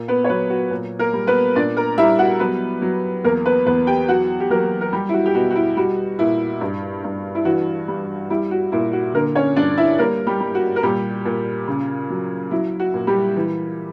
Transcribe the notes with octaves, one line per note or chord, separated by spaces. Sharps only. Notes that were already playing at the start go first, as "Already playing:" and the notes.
Already playing: A#2
B3 B4
C#5
F#3 B3 B4
F#4
A#2
A#3 A#4
G3
B3 B4
A#2 D4 D5
A#4 A#5
G3 E4 E5
F#4 F#5
F#3 B3 B4
F#3
E2 A#3 A#4
B3 B4
E2 B3 B4
G4 G5
F#3 F#4 F#5
G4
F#3 A#3 A#4
A#4
G3 G4
E4
F#4
G4
B2 F#4
F#4
E4
G3 F#4
A#2 E4
G2
G2
E4
E3 F#4
G3
G3 E4
F#4
A#2 E4
F#4
D3 A#3 A#4
C#4 C#5
G2 D4 D5
E4 E5
G3 A#3 A#4
G3 G4
G3
F#4
A#4
A#2 G3 G4
A#2
C#3
F#3
F#3 E4
F#4
A#2
G3 G4
E3